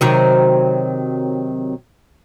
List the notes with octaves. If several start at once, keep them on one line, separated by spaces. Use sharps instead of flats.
C3 D#3 F#3